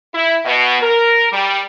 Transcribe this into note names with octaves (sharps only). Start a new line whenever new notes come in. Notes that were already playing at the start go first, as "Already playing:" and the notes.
E4
B2
A#4
G3